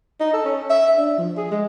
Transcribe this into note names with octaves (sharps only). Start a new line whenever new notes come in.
D#4
A4
C#4
E5
D4
F3
G#4
G#3